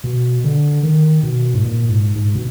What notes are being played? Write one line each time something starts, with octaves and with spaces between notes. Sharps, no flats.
B2
D3
D#3
B2
G#2
A#2
G#2
G#2
B2